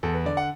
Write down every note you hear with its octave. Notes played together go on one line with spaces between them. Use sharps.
E2 A4
B4
D3 D5
F#5